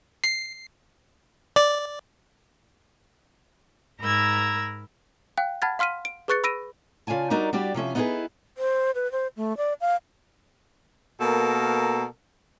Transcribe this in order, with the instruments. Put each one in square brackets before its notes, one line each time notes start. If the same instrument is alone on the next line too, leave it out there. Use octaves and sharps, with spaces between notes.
[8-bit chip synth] C7
D5
[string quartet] G#2 A#4 A#5 B5 E6 G#6
[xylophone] F5 G5 F#6
F#5 A5 B5 F6 G#6 A6
F5 C6 F6 B6 D#7
D7
G#4 B4 C#6 F#6 A6 C#7
B5 E6 A#6 D7 D#7
[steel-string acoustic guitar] C#3 F4 D5 G#5 A5
G3 D4 D#4 F#4 A#4 D5
G3 D4 F#4 G4 D5
C3 F3 C#4 E5
B3 D#4 E4 F#4 G#4 B4
[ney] C5
B4
C5
A3
D5
F5
[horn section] B2 A#3 A4 A#4